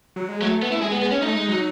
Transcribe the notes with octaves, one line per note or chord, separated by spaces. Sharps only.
F#3
G#3
F#3 A3
B3
E4
G#3 G#4
B3
G#3
B3
C#4
A3 D#4
G#3
F#3